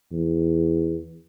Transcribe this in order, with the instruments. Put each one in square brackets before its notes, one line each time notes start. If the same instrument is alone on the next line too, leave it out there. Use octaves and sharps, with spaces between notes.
[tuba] E2